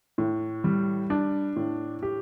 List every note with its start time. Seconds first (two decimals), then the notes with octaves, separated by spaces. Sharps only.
0.18 A2
0.64 G3
1.10 D4
1.56 A2
2.03 G4